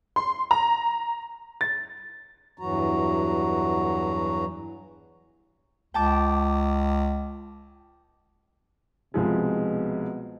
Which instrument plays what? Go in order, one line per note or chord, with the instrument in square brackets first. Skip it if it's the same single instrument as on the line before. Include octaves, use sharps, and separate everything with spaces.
[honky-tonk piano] C6
A#5
A6
[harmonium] E2 G2 E3 F#3 F#4 A#5
[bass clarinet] C#2 [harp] G5 A5 D6
[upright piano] C2 F3 G#3 [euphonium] B2